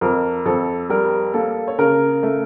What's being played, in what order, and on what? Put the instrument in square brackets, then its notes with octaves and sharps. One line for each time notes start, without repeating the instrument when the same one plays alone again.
[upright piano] F2 A#4
F2 A4
G3 A#4
A#3 A4
C#5
C#3 A#4
A3